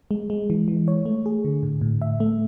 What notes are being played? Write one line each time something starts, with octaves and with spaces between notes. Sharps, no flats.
G#3
G#3
E3
E3
C#5
A3
G#4
D3
A2
A2
E5
A3